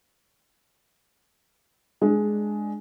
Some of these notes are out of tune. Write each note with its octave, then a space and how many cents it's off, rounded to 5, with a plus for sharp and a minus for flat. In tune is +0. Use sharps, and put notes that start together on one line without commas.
G#3 +10 D4 +10